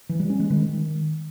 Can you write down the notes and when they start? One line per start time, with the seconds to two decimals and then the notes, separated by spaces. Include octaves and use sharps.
0.09 E3
0.20 G3
0.30 C#4
0.40 G#3
0.50 D#3